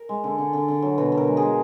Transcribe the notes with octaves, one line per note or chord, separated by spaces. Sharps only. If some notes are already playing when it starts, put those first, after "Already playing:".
Already playing: A#4
G#3
D3
D3
D3
D3
F#3
B2 B4
B2
A#4
G#3
G#4
G#3